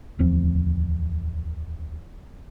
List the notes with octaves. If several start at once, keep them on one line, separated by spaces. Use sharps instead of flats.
D1 E2 F3 C4